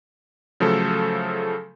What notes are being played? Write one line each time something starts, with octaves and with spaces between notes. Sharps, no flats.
C#3 F3 F#3 A3 A4